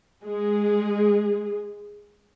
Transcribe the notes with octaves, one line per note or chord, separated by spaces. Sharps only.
G#3 G#4